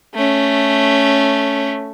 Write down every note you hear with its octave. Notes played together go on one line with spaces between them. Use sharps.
A3 C#4